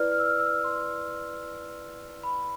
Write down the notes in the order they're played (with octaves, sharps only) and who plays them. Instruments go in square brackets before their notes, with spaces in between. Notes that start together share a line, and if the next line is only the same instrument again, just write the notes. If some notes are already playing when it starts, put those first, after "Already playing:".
Already playing: [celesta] E4 B4 D5 F6
F6
E6
F6
E6
F6
E6
C6
B5